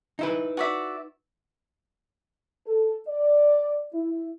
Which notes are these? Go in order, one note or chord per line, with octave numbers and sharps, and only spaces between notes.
D#4 E4 B4
F#4 D5 E5
A4
D5
E4